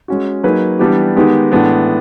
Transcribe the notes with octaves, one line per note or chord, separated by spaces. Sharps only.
G#3 C#4 F#4
F#3 A#3 D#4 G#4 B4
E3 G3 B3 D4 G4
D#3 G#3 B3 D#4 G4
A2 E3 G#3 B3 D4